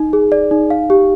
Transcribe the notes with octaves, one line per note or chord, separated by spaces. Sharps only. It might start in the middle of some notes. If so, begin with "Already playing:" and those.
Already playing: D#4
G#4
D5
D#4
F5
G4